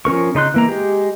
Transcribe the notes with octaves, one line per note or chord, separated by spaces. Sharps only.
F3 C#4 A#4 C#6
C#3 D#4 C6 F#6
E3 A#3 A#5
G#3 G4